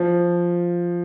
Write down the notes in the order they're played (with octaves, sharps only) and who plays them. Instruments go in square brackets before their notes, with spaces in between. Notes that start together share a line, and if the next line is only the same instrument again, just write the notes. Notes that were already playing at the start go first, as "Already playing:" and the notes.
Already playing: [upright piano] F3